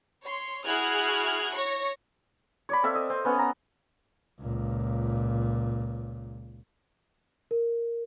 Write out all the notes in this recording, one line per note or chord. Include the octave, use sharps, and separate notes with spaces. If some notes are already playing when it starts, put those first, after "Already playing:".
C#5 C6
E4 F#4 G#4 F6 F#6 G#6
C#5 C#6 A#6
C#5 D5 B5
C4 A4 E5 F5
D#5
C4
B3 C#4 F#5
A#5
C#2 A#2
A#4